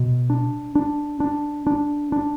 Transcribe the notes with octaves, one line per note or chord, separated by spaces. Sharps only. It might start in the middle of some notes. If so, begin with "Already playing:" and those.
Already playing: B2
D4
D4
D4
D4
D4